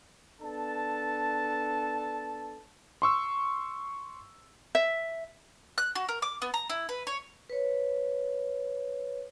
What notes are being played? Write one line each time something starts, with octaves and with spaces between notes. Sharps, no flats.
B3 D4 A4 A5
C6 C#6 E6
E5
F#6
F#4
A#4
D6
B3
A#5
E4
B4
C#5
B4 C#5